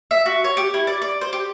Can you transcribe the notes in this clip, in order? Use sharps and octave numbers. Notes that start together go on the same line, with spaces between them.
E5
F#4
C#5
G4
E4
D5
D5
C5
G4